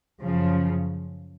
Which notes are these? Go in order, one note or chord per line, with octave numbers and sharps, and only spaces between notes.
F#2 C#3 F3